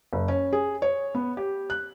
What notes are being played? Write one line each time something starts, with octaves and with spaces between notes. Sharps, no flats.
F#1
C#4
G#4
C#5
B3
G4
F#6